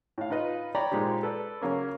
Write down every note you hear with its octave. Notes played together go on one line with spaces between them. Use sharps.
A2 F5
D#4 F4 B4 D#5
C#5 D5 G5 A#5 B5
A#2 G#3 C4 D#4 G4
A4 B4 D5
C#3 F#3 A#3 C#4